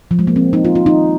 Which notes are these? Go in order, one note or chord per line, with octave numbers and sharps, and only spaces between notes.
F3
G#3
A#3
C4
D#4
F4
F4
D#4